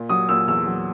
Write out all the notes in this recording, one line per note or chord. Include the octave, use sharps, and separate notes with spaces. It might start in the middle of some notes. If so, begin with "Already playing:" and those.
Already playing: A#2
F#3 D#6
A#2 E6
E2 E6
F#3